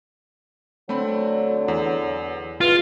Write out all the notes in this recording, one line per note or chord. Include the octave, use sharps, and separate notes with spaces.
D3 F#3 A3 C4 B5
E2
E2 B2 F4